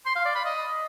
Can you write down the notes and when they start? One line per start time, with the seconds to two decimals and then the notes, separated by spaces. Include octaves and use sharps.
0.06 C6
0.16 F5
0.25 D5
0.35 B5
0.45 D#5